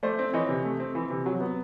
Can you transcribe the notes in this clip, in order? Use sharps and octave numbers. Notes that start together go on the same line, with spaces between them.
A3 C5 D5
C4
E3 C#5 D#5
C3
A3
C4
E3
C3
F#3
B3